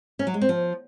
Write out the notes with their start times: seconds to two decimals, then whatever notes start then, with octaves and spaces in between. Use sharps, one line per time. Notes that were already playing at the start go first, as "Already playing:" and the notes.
0.19 C#4
0.27 F#3
0.34 G#3
0.41 C4
0.49 F3